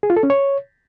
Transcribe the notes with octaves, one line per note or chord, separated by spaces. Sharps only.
G#4
F4
A4
C#4
C#5